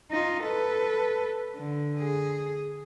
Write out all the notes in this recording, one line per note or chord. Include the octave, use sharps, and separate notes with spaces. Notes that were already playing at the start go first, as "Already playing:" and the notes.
D#4 F4
A4 B4
D3
G#4